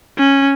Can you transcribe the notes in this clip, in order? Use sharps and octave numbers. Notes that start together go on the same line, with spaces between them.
C#4